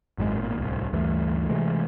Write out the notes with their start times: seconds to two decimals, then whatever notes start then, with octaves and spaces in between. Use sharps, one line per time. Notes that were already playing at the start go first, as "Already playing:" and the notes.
0.18 G#1 F#2 D3 G#3
0.37 G#1 A#2
0.56 D1 C2
0.93 D2 G2 E3 A3
1.49 C3 E3 G#3 A3